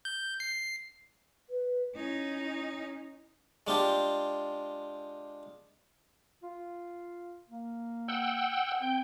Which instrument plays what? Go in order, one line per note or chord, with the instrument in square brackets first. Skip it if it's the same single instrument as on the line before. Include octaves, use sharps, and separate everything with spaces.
[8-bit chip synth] G6
C7
[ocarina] B4
[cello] C#4 D#4 [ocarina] E4
[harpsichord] G#3 D4 F4 G4
[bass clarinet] F4
A#3
[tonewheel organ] F#5 G5 E6
[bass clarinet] C4 [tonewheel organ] G5